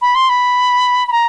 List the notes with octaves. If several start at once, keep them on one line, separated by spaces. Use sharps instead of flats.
B5
C6
B5
B5
A#5